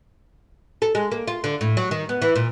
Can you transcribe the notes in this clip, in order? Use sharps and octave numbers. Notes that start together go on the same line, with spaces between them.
A4
G#3
A#3
F4
D3
A2
F#3
D#3
B3
E3
A#2